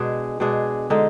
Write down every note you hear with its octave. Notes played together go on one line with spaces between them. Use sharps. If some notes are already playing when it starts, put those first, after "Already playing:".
Already playing: B2 G#3 D4 G#4
B2 G#3 D4 G#4
D3 G#3 D#4